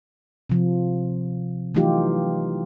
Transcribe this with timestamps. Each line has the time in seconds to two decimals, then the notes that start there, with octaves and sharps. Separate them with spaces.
0.50 C3 F3
1.75 E3 F#3 A3 D#4 F4 G4